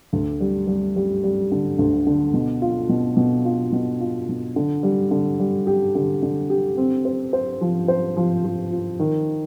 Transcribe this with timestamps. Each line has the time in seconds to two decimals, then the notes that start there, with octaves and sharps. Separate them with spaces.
0.13 D2
0.40 G3
0.67 G3
0.96 G3
1.24 G3
1.52 D3
1.79 D2
2.07 D3
2.33 B2
2.62 F4
2.89 B2
3.17 B2
3.45 F4
3.72 B2
4.00 F4
4.29 B2
4.56 D3
4.83 G3
5.11 D3
5.40 G3
5.67 G4
5.95 D3
6.23 D3
6.50 G4
6.77 C4
7.05 C5
7.33 C5
7.61 F3
7.88 C5
8.17 F3
8.44 F3
8.72 F4
8.99 D#3